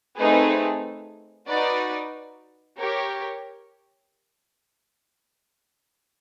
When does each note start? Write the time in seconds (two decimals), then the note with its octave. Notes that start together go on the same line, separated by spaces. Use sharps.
0.17 A3 C4 D#4 G#4 B4
1.47 D#4 F#4 B4 D5
2.78 G4 A#4 C#5